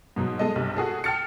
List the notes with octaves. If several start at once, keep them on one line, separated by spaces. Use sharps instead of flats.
G#2 B2 F#3
G#3 A4 D#5
B1 G2 C3
F#4 G#4 A4
G5 A5 F6 A6 C#7